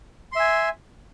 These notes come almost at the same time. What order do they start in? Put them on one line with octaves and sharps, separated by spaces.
C6 E5 G#5